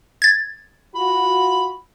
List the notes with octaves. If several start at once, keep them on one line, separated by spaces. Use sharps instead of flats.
G#6 A6
F4 F#4 B5